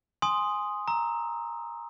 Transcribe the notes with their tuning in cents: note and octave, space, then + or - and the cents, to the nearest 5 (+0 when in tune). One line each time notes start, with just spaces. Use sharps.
G#5 +0 C6 +0 D#6 +0
A#5 +0 E6 -25